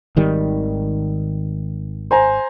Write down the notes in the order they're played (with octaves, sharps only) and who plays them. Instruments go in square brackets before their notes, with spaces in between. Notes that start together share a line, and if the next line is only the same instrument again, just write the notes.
[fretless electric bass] G#1 D#3 G3
[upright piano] C5 G#5 A#5